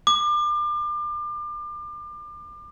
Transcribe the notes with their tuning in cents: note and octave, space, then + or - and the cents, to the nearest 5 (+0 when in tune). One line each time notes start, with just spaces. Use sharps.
D6 +35